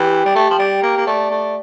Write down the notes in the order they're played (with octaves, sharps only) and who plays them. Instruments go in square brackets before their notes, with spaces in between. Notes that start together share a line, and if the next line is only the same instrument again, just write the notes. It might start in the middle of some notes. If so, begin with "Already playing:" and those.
Already playing: [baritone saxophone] E3 [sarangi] G4
[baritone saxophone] G3
A3
F3
G3
A#3
A#3
[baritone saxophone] A3 [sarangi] D5
[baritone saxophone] A3